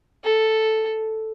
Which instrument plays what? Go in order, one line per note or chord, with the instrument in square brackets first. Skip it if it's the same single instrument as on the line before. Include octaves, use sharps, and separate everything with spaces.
[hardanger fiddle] A4